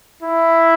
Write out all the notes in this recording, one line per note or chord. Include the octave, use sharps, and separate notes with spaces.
E4